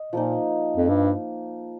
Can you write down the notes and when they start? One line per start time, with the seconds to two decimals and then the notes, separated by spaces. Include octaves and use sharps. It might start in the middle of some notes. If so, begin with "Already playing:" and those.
Already playing: D#5
0.12 A#2 F3 A#3 D#4
0.77 F2
0.89 G2